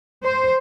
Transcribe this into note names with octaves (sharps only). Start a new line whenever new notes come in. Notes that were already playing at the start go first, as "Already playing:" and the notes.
C5